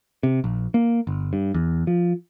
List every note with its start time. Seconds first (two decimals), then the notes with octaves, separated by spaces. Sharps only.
0.23 C3
0.44 A#1
0.74 A#3
1.07 G1
1.33 G2
1.54 E2
1.87 F3